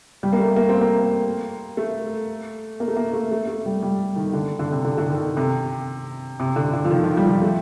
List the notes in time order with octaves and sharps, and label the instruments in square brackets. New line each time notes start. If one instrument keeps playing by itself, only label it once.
[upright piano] G3
A#3
A3
A#3
C4
A#3
A3
A#3
A3
A#3
A3
A3
A3
G3
G3
D#3
D3
D3
C3
D3
D3
D#3
C3
C3
D3
D3
F3
D#3
F3
G3
F3
A3